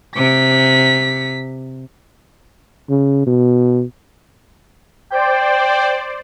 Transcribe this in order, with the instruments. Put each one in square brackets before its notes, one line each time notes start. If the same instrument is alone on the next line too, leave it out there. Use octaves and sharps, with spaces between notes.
[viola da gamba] C3 [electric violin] B6
[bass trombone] C#3
B2
[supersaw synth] C5 D5 [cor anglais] G5